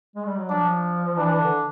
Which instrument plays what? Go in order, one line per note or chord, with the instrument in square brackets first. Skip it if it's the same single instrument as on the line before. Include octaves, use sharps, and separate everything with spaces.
[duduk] G#3
G3
F#3
[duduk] F3 [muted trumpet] D4
[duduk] E3 [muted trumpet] D4
[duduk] D3